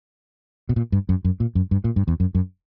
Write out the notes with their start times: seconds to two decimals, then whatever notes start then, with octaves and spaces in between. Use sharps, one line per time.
0.69 B2
0.76 A#2
0.92 G2
1.09 F#2
1.25 F#2
1.40 A#2
1.55 F#2
1.71 G2
1.84 A#2
1.96 G2
2.08 E2
2.20 F#2
2.35 F#2